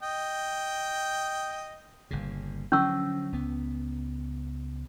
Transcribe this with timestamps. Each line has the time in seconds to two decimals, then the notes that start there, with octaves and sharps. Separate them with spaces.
0.03 D#5 G5
2.11 G1 A#2 C#3
2.72 D3 F3 F#3 C#4 C#6 E6
3.32 C#2 B3